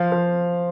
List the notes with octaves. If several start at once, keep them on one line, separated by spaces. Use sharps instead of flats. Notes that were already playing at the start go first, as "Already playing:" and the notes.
Already playing: F3 F5
F3